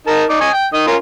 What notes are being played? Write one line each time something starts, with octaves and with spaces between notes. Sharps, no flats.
D#4 A#4 A5
D#4 D5
D#5 G#5 C#6
G5
D#3 D#5
C#4 F4 A#4